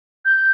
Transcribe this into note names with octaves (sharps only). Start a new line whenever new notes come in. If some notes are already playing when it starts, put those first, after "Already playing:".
G6